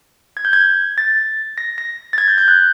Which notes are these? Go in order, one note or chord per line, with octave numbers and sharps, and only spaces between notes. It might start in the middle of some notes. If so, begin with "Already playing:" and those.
G#6
G6
G#6
A6
A#6
A#6
A6
G#6
G6
G6
F#6